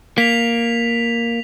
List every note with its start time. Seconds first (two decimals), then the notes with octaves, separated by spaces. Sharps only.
0.18 A#3 B6 F7